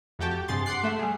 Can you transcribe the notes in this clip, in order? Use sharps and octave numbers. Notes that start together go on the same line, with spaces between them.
F2 A3 F#4 G4 G5 A5
G4
G2 C3 G#4 C6 A6
F#5 C6 D6 F#6 C7
A3 E5
G3 G#4